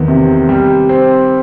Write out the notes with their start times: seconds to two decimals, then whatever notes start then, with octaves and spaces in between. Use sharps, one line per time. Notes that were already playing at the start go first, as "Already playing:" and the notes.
Already playing: E2 D#3
0.08 C3
0.49 G3
0.89 C4